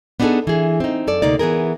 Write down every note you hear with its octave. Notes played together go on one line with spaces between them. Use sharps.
B3 D4 D#4 F#4 G#4 A4
E3 G#4
C4 D#4
F#2 A4 D5
D2 C3 A#3 D#4 D5
E3 B3 G#4 A#4